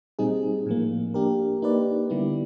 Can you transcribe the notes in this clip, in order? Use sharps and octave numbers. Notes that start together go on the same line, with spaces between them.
A#2 G3 C4 D#4 G#4
A2 F3 A#3
A#3 D4 G4 A#4
A#3 D#4 G4 B4 D5
D3 G3 B3 E4